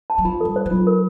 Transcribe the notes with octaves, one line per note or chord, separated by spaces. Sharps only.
A5
F#3
F3 F4
G3 A4
C5
F#3
F4
A#4